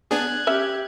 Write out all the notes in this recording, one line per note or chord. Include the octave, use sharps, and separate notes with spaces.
B3 D4 G#4 F#6 G#6
C#4 G4 E5